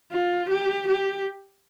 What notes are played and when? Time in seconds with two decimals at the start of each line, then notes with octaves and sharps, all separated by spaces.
0.12 F4
0.49 G4
0.87 G4